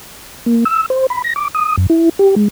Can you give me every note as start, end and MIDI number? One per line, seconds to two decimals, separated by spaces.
0.46 0.64 58
0.65 0.86 88
0.90 1.07 72
1.10 1.22 83
1.24 1.33 94
1.36 1.48 86
1.55 1.76 87
1.78 1.86 42
1.90 2.09 64
2.19 2.35 67
2.36 2.48 56